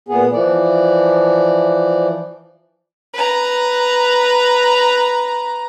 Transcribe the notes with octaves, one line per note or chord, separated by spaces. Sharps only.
A#2 B3 G#4
E3 F3 D5
B4 A#5